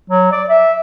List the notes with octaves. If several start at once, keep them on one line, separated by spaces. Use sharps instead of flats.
F#3
D5
E5